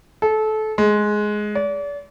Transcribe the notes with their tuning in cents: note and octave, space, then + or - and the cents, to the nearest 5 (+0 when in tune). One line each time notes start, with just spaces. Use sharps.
A4 -25
G#3 +10
D5 -35